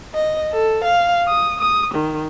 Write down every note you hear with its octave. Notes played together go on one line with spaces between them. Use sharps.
D#5
A4
F5
D#6
D#6
D#3